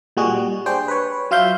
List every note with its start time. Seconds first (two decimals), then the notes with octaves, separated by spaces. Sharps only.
0.17 A#2 G3 G#3 F#4 G#4
0.35 G3
0.66 D4 G#4 C5 G5
0.88 B4 C#5
1.31 F#3 F4 E5 F5 G6